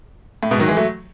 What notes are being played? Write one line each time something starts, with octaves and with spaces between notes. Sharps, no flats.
A2
G#2 B2
D#3 F#3
E3 G#3
F#3 A3